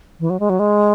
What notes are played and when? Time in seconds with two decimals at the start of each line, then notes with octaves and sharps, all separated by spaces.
0.20 E3
0.30 F#3
0.40 G#3
0.50 F#3
0.59 G#3